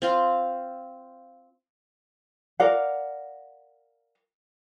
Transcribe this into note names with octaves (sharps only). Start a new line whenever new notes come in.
C4 F4 F5
A#4 D5 F5 F#5